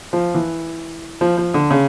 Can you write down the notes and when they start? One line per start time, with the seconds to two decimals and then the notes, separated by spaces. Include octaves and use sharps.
0.13 F3
0.34 E3
1.21 F3
1.38 F3
1.54 D3
1.71 C#3